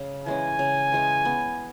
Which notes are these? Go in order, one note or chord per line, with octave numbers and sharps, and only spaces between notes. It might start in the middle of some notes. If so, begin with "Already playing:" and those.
Already playing: C#3
E3 G#3 C#4 G#5
C#3
E3 G#3 C#4
B3